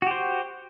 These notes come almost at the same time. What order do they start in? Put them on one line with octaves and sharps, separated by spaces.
F#4 G4 C5